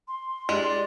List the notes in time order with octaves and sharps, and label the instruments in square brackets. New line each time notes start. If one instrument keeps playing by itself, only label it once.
[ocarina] C6
[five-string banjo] G#3 [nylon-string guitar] D4 E4 G4 [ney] D5